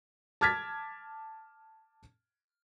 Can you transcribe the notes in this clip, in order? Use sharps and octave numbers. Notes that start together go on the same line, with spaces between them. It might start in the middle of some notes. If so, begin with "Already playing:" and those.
A5 D6 F6 G#6 A6 B6